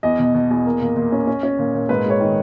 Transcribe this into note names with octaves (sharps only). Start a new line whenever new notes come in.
E2 D#5
B2
B2
E2
A#3
A#2
A#2
C#4
C#4
C#4
A#2
A#2
G#2 B4
G#3 C#5
D#3